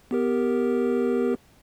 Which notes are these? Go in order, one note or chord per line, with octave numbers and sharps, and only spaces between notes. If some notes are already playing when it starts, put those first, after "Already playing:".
B3 G4 A#4